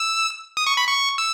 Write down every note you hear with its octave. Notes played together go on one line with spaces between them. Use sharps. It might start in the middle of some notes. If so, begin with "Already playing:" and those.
Already playing: E6
D#6
C#6
B5
C#6
E6